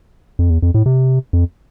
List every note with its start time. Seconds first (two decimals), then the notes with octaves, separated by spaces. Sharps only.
0.39 F2
0.50 E2
0.62 F2
0.74 A2
0.86 C3
1.33 F2